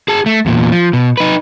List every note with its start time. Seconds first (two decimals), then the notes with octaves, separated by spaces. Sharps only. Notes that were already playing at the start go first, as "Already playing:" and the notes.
0.08 G#4 A5
0.26 A3
0.46 E2 A#2
0.72 F3
0.93 B2
1.17 D#4 B4